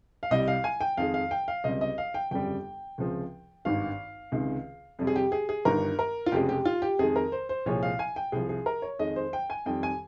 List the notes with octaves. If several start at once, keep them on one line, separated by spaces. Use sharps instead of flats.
F5
C2 C3 G3 D#5
F5
G#5
G5
F2 D#3 G#3 F5
F5
G5
F5
C#2 C3 G3 D#5
D#5
F5
G5
G1 F2 C#3 G3 G5
C#2 C3 F3 G#3
G#1 G2 D#3 F5
C#2 C3 D#3 G#3
F2 C3 G3
G#4
G4
G#4
G#4
G1 G2 D#3 A#4
A#4
F4
F1 F2 C#3 G#3 G4
G4
F4
G4
F2 D#3 G#3 G#4
A#4
C5
C5
C2 A#2 F3 G#3 C#5
F5
G#5
G5
C2 C3 F3 G#4
G#4
A#4
C#5
F2 D#3 G#3 D#5
C5
G5
G#5
F2 D#3 G3 G5
G#5